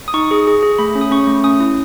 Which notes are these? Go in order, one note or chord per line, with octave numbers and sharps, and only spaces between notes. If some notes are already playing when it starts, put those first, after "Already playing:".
D#6
D#4 C#6
G#4
G#4
G#4
A3 B5
C#4
D#6
C#4 C#6
A3
C#4 D#6
E4